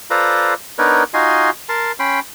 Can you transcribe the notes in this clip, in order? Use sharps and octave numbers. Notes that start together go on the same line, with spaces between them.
F4 A4 B4 C5 D5 A#5
B3 D4 D#4 A#4 B4 C#5
D#4 F4 F#4 D#5 G#5 C6
A#4 A5 C6
C#4 G5 B5 C6